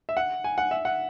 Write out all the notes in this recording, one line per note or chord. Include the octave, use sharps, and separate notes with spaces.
E5
F#5
G#5
F#5
E5
F#5